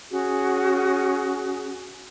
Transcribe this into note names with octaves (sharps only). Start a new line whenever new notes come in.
C#4 F#4 G#4